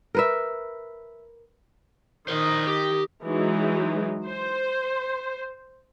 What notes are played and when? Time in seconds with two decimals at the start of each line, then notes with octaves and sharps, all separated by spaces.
0.15 A#4 B4 E5
2.28 D#3 A#4 C5 D#5
2.67 G4
3.22 E3 F#3 G#3 D#4
4.24 C5